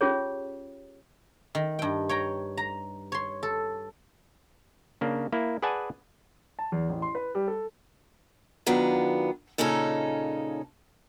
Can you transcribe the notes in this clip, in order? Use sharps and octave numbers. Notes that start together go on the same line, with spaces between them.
C#4 F4 G4 G#4 C#5
D#3
G2 G5
C#5 G5 A#5
A#5
C#5 C6
A4
C#3 A#3 D4
A#3 E4
G#4 B4 D5 F#5 G#5 A5
A5
E2
A1
C6
B4
G3
A4
D#3 F#3 B3 D4 F4
A#2 C#3 C#4 D#4 A4